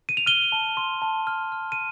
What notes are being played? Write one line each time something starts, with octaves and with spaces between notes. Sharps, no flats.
D#7
F7
F6 D#7 G7
A5
C6
A5
F6
F6
D#7